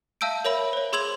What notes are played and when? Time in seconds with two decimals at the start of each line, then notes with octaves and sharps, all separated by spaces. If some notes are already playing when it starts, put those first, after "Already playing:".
0.21 E5 F5 A5 E6 G6 D7
0.45 A#4 C#5 E5 B5 F#7
0.73 C5 C#5
0.93 G#4 C6 E6 G#6 F7 F#7